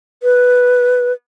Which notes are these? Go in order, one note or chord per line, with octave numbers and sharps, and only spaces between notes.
B4